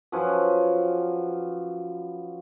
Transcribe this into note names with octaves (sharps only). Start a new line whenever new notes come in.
F#2 F3 B4 G#5